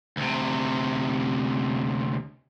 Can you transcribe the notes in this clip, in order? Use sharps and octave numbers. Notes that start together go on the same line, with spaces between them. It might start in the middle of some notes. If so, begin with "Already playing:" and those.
D2 C3